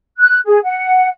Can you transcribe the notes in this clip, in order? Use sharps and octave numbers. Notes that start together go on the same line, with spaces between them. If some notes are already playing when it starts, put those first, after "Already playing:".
F#6
G#4
F#5